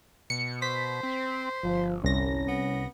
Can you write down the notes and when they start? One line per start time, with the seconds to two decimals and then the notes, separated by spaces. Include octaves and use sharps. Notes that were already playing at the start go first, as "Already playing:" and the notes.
0.30 B2 C#7
0.62 C5 B6
1.03 C4
1.63 G1 F3
2.04 C2 C#4 A#6
2.48 B3